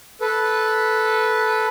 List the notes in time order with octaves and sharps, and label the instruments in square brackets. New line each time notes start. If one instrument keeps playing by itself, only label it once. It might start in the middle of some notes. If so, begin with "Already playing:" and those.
[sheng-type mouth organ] A4 B4